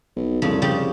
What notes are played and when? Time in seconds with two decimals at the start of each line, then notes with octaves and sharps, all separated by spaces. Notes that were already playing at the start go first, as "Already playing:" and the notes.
0.17 B1
0.42 C2 F2 C#3
0.62 C#3 G4